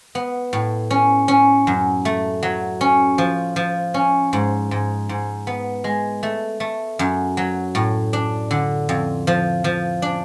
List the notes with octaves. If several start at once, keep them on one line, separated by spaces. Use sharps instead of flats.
B3
A2
C#4
C#4
F#2
A3
F#3
C#4
F3
F3
C#4
G#2
G#2
G#2
B3
G#3
A3
A3
F#2
F#3
A2
D4
D3
F2
F3
F3
D4